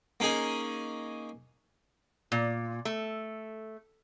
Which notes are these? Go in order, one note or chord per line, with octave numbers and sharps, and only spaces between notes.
A#3 C#4 D#4 G#4 G#5
A#2
A3